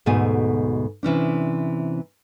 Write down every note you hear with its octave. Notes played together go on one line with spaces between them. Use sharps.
D2 G#2 B2 A3 G#5
C3 E3 C#4 D4